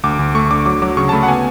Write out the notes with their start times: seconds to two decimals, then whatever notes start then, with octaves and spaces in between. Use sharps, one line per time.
0.04 D2 D6
0.19 D2
0.35 A3 C#6
0.50 D3 D6
0.66 F#3 D6
0.82 F#3 D6
0.97 C#3 C#6
1.09 A5
1.13 A3 B5
1.23 F#5
1.28 B3 G#5